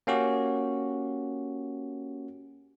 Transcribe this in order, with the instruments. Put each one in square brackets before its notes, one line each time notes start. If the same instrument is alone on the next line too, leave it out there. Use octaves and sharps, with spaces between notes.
[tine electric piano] A#3 C#4 F#4 G4